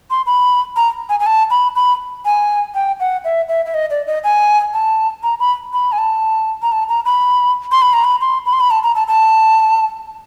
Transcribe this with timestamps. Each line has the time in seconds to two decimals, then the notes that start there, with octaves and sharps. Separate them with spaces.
0.11 C6
0.26 B5
0.76 A#5
1.09 G#5
1.20 G#5
1.26 A5
1.51 B5
1.76 B5
2.25 G#5
2.75 G5
3.00 F#5
3.24 E5
3.49 E5
3.66 E5
3.74 D#5
3.90 D5
4.07 D#5
4.24 G#5
4.74 A5
5.23 A#5
5.40 B5
5.73 B5
5.92 G#5
5.98 A5
6.62 A#5
6.72 A5
6.89 A#5
7.05 B5
7.72 C6
7.82 B5
7.93 A#5
8.04 B5
8.21 C6
8.46 B5
8.53 C6
8.60 B5
8.71 A5
8.83 A#5
8.95 A5
9.08 A5